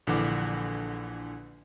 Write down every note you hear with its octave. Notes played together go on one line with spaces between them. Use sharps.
A#1 D3 E3 F#5 D6